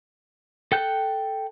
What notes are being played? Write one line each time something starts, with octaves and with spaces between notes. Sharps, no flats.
A4 G5 F#6 G6